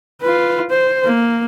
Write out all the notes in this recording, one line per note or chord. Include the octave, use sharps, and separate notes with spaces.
F4 B4
C5
A#3